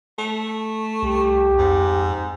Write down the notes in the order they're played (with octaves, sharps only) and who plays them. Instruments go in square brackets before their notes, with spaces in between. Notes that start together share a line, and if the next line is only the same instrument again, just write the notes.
[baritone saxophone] A3
[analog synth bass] C2 [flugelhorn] G4
[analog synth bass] F2 [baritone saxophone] G#2